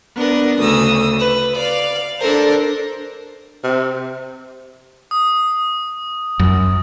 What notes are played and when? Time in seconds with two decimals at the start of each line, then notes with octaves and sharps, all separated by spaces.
0.17 B3 D4 A#4
0.61 D2 C#3 D#6 E6
1.19 B4
1.57 D5 F5
2.21 D4 A4 A#4 C5
3.64 C3
5.11 D#6
6.40 F#2